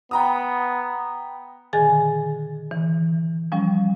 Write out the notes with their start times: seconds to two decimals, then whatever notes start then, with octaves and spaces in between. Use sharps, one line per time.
0.11 B3 G5 A#5 D#6
1.73 A#2 D3 D#3 G#4 G#5 A6
2.71 E3
3.52 F3 G3 C#4